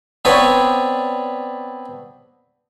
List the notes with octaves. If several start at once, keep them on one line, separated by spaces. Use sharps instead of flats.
B3 C4 D4 B4 C#5 D5